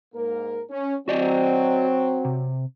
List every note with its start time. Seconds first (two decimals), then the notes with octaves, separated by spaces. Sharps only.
0.14 G#2 A#3 A#4
0.70 C#4
1.08 F#3 C4 F#4 D5 D#5
2.25 C3